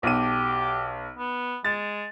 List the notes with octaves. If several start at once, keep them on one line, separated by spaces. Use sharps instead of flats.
B1 G4 D#7
B3
G#3 A6